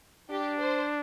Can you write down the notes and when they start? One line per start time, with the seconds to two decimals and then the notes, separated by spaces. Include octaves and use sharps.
0.30 D4 G4
0.59 C5